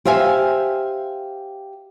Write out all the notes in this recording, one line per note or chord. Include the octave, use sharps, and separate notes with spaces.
G4 C5 E5 F5 G#5